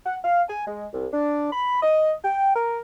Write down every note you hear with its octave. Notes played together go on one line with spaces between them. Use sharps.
F#5
F5
G#5
G#3
C2
D4
B5
D#5
G5
A#4